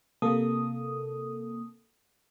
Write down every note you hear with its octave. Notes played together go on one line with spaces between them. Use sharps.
C3 A#3 A4 D#6